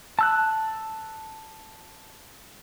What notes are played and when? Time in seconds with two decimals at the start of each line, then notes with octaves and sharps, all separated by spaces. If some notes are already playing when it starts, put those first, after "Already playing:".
0.19 A5 E6 F#6